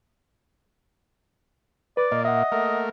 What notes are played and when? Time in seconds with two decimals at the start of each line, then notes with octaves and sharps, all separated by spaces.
1.97 B4 D5
2.12 A#2 A#3 D#5
2.25 D#5 E5 F#5
2.52 A3 A#3 A#4